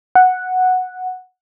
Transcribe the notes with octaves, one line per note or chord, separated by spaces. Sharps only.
F#5